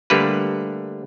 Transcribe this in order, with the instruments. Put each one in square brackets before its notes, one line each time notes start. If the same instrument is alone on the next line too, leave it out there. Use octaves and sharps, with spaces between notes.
[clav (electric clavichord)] D3 G3 A3 A#3 B4